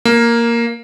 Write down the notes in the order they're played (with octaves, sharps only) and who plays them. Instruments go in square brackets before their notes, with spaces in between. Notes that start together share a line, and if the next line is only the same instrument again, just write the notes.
[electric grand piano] A#3